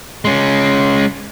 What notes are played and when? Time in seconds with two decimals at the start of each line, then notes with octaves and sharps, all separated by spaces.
0.25 G#3 C#4